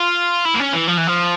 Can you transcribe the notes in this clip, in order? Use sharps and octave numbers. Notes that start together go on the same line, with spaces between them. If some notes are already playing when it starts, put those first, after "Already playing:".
Already playing: F4
E4
A#3
C#4
E3
F3
E3
F3